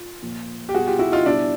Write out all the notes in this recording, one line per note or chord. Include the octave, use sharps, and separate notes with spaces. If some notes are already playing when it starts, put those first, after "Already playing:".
Already playing: F4
A#2 F3
G4
B2 G3 F#4 G#4
F4 G4
E4 F#4
D#4 F4
B2 G3 D4 E4